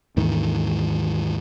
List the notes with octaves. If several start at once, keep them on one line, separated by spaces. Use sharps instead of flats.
D#2 G#2 D#3 E3